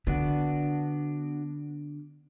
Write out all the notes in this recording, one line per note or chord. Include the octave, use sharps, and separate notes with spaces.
D3 B3 D4 F#4